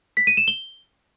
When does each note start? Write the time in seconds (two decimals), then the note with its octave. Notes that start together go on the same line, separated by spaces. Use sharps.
0.17 B6
0.27 D#7
0.37 E7
0.48 G7